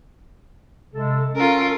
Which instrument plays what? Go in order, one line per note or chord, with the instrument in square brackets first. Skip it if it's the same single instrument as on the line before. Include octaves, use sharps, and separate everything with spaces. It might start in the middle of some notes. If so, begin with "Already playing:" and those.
[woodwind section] C3 G#3 A4
[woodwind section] C#4 A4 [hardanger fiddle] F4 A#4